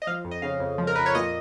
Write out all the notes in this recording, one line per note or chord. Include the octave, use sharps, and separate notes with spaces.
D#5
F3 F5
F2
D#5
C#3 F5
F2
F3
A#4
F2 B4
C#5
A#2 D#5